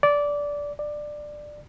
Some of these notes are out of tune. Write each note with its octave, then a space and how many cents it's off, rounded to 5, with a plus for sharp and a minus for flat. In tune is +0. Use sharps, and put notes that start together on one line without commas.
D5 -15
D5 +15